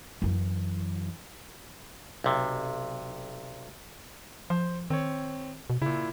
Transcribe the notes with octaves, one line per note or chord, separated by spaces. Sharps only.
F#2 E3
B1 C3
F3 C5
D#3 C4 C#5
B2
A#2 C#3 E4